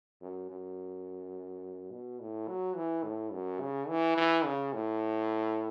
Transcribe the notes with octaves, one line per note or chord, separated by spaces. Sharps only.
F#2
F#2
B2
A2
F#3
E3
A2
F#2
C#3
E3
E3
C#3
A2